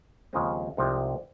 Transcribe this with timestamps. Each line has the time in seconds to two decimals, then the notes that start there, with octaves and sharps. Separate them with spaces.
0.33 D#2 C#3 F3 G#3 C4
0.77 C2 C3 F3 G#3 D#4